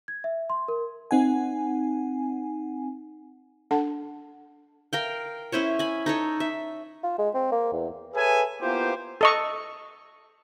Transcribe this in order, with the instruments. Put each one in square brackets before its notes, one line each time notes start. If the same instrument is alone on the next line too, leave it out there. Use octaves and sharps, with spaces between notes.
[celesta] G#6
E5
C6
A#4
[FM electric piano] C4 D#4 F#5 G#5
[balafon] D4 A4 F#5 A5
[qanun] A#4 F5 G5
C#4 E4 C5 C#5
G#5 B5
D#4 A4 C#5
E5
[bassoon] F4
G#3
C4
A#3
E2
[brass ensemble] G#4 A4 B4 C#5 E5 G#5
A#3 B3 E4 F4 G4 C5
[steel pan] A4 D#5 C#6